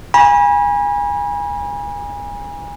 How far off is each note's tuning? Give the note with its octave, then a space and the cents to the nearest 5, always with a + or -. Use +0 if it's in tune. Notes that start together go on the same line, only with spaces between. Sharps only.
G#5 -25 B5 -40